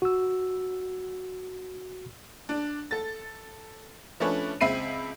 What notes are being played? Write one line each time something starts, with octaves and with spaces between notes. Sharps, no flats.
F#4 E6
D4
A4 A6
F3 A3 C#4 D4 B4 C#5
C#2 C4 E5 B5 C7 D#7